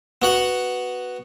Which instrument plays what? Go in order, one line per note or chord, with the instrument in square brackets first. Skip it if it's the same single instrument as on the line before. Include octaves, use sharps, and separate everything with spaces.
[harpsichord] B3 F#4 F#5